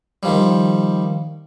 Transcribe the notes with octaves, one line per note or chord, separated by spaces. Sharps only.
D#3 F3 G3